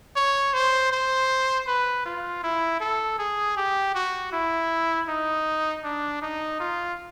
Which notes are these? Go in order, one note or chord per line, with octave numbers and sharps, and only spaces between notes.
C#5
C5
C5
B4
F4
E4
A4
G#4
G4
F#4
E4
D#4
D4
D#4
F4